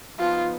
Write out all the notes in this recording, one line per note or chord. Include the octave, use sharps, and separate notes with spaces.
F3 B3 D#4 F4